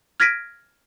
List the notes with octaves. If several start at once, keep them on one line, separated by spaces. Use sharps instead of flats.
F6 G#6 A#6 B6 D7 D#7